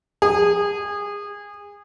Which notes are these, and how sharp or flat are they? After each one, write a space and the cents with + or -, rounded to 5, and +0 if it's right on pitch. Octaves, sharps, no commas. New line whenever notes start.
G#4 -25